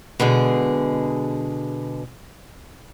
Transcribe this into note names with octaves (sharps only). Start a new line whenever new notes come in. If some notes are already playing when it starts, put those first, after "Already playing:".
B2 D3 G#3 G#4